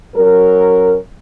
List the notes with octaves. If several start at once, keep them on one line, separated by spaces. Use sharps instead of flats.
F#3 C#4 A#4